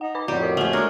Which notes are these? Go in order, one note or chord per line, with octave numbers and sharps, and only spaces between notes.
D#4 F#5
B4 B5 D6
F2 A2 F#4 G4 D5 F5 A#5
A#4 D6 D#6
A3 G#4 F#5 F6
G#3 D4 A#4 C#5 A#6